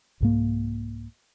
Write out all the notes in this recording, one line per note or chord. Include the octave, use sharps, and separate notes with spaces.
C2 G#2 A#3